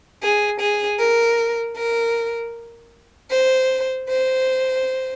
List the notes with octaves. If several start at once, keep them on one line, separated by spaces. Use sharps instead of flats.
G#4
G#4
A#4
A#4
C5
C5